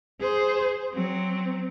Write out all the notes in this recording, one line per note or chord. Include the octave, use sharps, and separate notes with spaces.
G#4 C5
F#3 C4